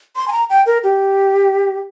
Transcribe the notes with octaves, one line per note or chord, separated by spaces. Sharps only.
C6
G#5
A#5
G5
A#4
G4